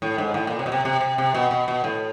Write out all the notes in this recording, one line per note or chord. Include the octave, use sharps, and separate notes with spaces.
A2
G#2
A2
A#2
C3
B2
C3
C3
C3
C3
B2
B2
B2
A2